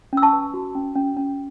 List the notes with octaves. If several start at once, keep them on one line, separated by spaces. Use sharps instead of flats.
C#4 E6
A5 C#6
B4
F#4
C#4
C#4
C#4